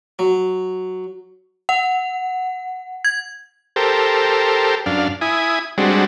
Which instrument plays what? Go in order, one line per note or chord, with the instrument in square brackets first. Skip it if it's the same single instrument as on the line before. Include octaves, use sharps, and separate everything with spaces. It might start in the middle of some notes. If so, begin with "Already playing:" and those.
[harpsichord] F#3
[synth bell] F#5
G#6
[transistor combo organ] G4 A4 A#4 C5
F#2 D4 F5
E4 G#5 D#6
G3 G#3 C4 D4 F#4